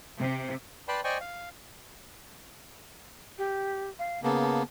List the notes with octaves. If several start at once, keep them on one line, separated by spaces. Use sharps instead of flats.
C3
B4 D5 G5 A5 B5 C6
C5 D5 D#5 G5 G#5 C#6
F5
G4
F5
C#3 A#3 B3 A5
A5